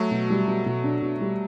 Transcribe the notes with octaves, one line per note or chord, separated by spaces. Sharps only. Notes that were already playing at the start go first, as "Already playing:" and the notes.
Already playing: F#3 A3
B2
G3
B2
B2
D4
B2
G3